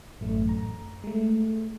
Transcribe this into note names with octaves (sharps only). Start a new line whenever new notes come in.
A1 F#2 A3
A#5
G#3 A3